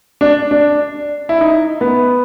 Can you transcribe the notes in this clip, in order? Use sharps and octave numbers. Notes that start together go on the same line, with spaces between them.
D4
D4
E4
D#4
B3